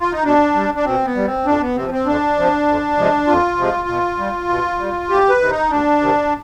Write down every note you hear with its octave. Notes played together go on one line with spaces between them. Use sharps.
F4
D#4
B2 D4
G3
D4
B2 C4
B3
G3
C4
F2 D4
B3
C3 F3 C4
C4
F2 D4
C3 F3
F2
C3 F3 G#3
F2 F4
C3 F3 G#3
B2
G3
B2
G3
D2 G4
B4
C3 D#3
D#4
D2 D4
C3 D#3